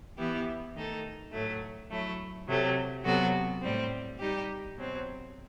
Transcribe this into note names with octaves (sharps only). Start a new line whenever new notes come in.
E3 B3 E4 G4
D#3 A3 D#4 A4
A2 F#3 A3
F#3 A3 E4
C3 F#3 A3
C3 F#3 B3 F#4 A4
A2 G3 C4
G3 D#4 G4
B2 F#3 C4